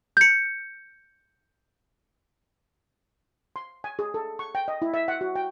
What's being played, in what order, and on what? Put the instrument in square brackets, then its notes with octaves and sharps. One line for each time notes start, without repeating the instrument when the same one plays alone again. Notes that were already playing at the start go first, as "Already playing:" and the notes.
[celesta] G6 C#7
[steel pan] C6
G#5
G#4
A4
C#6
G5
D#5
E4
E5
F#5
F#4
G5